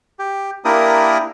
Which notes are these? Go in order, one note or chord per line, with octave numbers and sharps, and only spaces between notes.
G4
A#3 D4 E4 G4 A#4 D#6